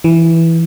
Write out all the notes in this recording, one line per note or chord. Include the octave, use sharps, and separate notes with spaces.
E3